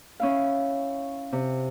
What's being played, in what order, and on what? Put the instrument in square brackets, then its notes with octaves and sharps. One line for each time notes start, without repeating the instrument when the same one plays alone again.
[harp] C#4 E4 F5
C3